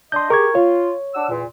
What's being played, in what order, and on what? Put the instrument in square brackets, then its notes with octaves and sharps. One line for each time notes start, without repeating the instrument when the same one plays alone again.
[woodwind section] D4 D#5 [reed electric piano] C6 G6
[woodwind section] G4 G#4 [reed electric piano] A#4 C#6 G#6
[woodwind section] F4 [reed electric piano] C#5
[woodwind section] D4 F#5 E6
E2 A#2